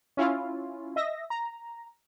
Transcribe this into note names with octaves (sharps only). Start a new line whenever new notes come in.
C#4 E4 F4
D#5 E5 A#6
A#5